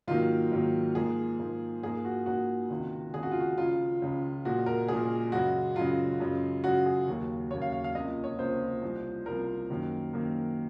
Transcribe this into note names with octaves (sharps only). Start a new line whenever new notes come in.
G#2 D#3 F#3 A#3 F4
G#2 D#3 F#3 A#3
G#2 F3 A#3 G#4
G#2 F3 A#3
G#2 F3 A#3 G#4
F#4
G#2 F3 A#3 F#4
C#2 C3 D#3
C#2 C3 D#3 G#4
F#4
F4
F#4
C#2 C#3 F3 F4
C#2 C#3 F3
A#2 F3 G#3 F#4
A#4
A#2 F3 G#3 G#4
F#2 C#3 G#3 F#4
F#2 C#3 G#3 F4
F#2 C#3 G#3
F#2 C#3 G#3 F#4
G#4
D#2 C#3 F#3 A#3
D#2 C#3 F#3 A#3 C#5
F5
F5
F5
C#2 C3 F3 A#3 D#5
C#5
C#2 C3 F3 A#3 C5
C2 C3 F3
C2 C3 F3 A#4
F#2 D#3 A#3
F#2 D#3 A#3